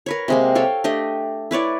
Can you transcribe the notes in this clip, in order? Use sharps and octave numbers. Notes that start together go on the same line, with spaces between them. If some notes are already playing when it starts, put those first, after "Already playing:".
A#4 B4 C#5
C3 G#3 A#3
A4 C#5 F5 G5
A3 D4 G4 D#5
E4 B4 C#5 D5